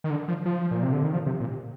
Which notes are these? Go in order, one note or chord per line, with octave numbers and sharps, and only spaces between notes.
D#3
D3
F3
F3
A#2
C3
D3
D#3
F3
C3
A#2